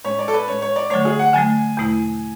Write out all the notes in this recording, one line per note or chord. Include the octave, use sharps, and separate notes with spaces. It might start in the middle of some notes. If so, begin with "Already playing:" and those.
A2 G#3 C#4 C#5
D5
A4
B4
A2 G#3 C#4 C#5
C#5
D5
D3 F#3 A3 C#5
G#4
F#5
D3 F#3 A3 G#5
E2 B2 A3 E4